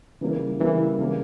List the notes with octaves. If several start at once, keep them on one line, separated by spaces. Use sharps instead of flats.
C#3 E3 G3 A#3 E4
C#3 E3 G3 A#3 E4
C#3 E3 G3 A#3